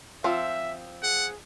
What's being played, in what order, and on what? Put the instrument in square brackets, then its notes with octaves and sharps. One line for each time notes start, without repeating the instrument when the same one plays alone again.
[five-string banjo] F3 C4 [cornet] E5
[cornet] G#4 [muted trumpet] F#5